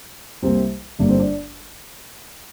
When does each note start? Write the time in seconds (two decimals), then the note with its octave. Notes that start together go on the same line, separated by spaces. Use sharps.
0.42 C2 C3 A#3 C4
0.99 G1 G2 D3 A#3 D4
1.09 C4
1.19 D4